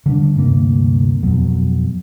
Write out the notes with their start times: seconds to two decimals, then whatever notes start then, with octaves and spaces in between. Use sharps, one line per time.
0.06 D3 G3 D4
0.35 D2 G2 C3 A#3
1.23 F2 B2 F#3